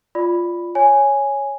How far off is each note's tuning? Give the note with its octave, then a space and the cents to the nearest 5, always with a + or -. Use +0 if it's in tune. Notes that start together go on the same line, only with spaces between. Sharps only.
F4 -5 D5 +0 B5 +0
C#5 +0 G#5 +0